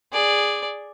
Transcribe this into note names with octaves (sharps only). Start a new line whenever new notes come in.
G#4 D5